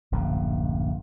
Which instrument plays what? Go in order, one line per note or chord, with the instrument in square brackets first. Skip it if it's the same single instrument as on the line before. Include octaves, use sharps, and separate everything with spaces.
[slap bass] D1 A#1 F#2